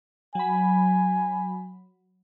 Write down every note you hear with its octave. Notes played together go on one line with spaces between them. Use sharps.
F#3 G#5 B5